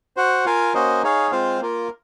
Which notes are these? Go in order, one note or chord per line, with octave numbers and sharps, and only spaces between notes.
F#4 C5 F#5
F4 A#4 F5 G#5
A#3 C#4 F#4 C5 D#5
D#4 G#4 C#5 F5
G#3 C4 F4 C5 F5
A#3 F4 A#4